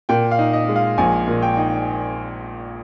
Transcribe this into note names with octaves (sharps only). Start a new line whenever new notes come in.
A#2 G5
F5
D#4
D#5
G#3
F5
A#1 G#5
A#2
G5
D#4